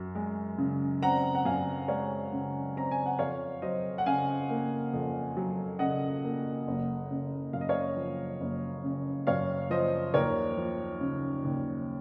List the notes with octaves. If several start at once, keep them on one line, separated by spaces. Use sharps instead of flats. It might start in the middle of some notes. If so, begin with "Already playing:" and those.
Already playing: F#2
G#3
C#3
C4 F#5 A#5
F#5
F#2 F5 G#5
G#3 C#5 F5
C#3
C4 A#5
G#5
F#5
F2 C#5 F5
F#3 C5 D#5
F#5
C#3 F5 G#5
A#3
F2
F#3
C#3 D#5 F#5
A#3
F#1
C#3
F#2 F5
D#5
C#5 F5
F3
F#1
C#3
F#2 C#5 F5
F3 C5 D#5
D#2 A#4 C#5
F3
C#3
D#2